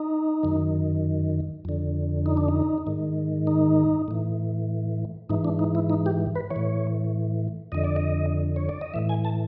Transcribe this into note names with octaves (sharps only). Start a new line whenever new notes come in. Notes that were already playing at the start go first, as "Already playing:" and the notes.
Already playing: D#4
F#2 D#3
F2 D3
D#4
D4
D#4
G#2 D#3
D#4
A2 E3
G#2 E3 D#4
D4
D#4
E4
D#4
G4
B4
E3 C#5
A2
F2 D3 D#5
D5
D#5
C#5
D5
D#5
A2 E3 E5
G#5
A5